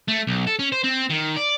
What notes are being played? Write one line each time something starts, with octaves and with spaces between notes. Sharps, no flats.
A3
B1
A4
C#4
C5
C4
D#3
D5